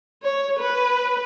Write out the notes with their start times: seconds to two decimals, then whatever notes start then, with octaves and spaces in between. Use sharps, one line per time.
0.22 C#5
0.59 B4